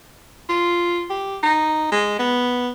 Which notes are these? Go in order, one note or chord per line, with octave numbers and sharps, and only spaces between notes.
F4
G4
D#4
G#3
B3